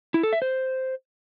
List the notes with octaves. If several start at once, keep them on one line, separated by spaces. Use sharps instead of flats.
E4
A4
E5
C5